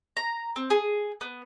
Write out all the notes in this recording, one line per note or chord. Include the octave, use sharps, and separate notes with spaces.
A#5
C4
G#4
B3